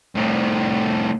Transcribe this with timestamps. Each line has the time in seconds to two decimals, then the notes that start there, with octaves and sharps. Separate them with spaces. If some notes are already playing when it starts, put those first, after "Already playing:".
0.16 C2 A2